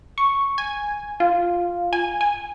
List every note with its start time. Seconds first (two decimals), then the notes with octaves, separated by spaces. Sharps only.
0.18 C#6
0.58 G#5
1.20 F4
1.93 G#5
2.21 G#5